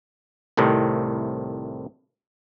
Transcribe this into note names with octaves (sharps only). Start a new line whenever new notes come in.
C2 A2 C3 D#3